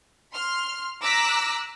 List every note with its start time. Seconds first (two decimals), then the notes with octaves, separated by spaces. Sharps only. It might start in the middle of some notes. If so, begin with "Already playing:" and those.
0.34 C6 F6
1.02 A#5 D6 E6 F#6 A#6 B6